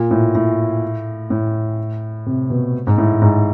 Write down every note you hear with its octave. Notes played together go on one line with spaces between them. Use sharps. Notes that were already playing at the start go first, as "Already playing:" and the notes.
Already playing: A#2
A2
A2
A2
C3
B2
G#2
A2
G#2